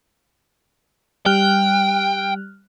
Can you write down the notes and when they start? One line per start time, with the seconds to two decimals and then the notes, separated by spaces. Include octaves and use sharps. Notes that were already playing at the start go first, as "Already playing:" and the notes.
1.26 G3 G5 F6 F#6